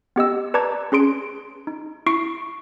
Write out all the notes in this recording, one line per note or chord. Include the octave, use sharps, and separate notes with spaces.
B3 G4 D#5 E6
B4 D5 A5 A#5 D6 G#6
C#4 G#4 C6 D7
D#4
E4 C#6 C7 D7